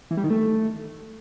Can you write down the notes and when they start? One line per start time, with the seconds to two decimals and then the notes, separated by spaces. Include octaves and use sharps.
0.11 E3
0.17 G3
0.24 D#3
0.30 A3